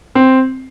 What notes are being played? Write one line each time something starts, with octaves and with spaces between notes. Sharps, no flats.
C4